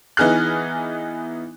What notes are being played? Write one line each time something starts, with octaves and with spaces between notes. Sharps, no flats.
E3 B3 D#4 G#4 F6 F#6